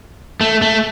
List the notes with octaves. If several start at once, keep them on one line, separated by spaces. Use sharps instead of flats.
A3
A3